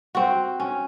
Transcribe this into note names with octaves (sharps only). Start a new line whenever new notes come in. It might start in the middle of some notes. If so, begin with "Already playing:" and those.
C4 F#4
C#4